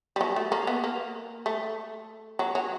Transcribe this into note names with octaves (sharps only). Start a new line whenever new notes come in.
G3
F#3
A3
A#3
B3
A#3
A3
F#3
F#3